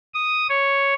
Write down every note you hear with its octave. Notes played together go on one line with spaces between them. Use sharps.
D#6
C#5